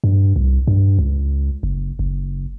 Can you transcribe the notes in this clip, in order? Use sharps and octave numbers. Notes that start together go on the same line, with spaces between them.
G2
C2
G2
C#2
F#1
F#1